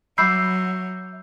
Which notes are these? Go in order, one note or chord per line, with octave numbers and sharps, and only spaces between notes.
F#3 E5 B5 D6 E6 G6 C7